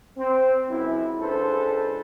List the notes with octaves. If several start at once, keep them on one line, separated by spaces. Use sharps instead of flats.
C4
C#2 F#2 E4
C#2 D4 A4 B4 C5